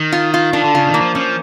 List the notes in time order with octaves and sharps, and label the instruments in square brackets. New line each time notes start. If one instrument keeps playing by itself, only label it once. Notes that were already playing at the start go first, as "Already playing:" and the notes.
Already playing: [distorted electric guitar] D#3
[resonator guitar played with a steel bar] F4
F4
[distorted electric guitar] D#3 [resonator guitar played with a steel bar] D4
[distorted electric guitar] D3
[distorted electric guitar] C#3 [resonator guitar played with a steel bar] F4
[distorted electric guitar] D#3
[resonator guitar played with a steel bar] A#3
[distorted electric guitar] F3
[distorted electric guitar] F3 [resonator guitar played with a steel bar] C#4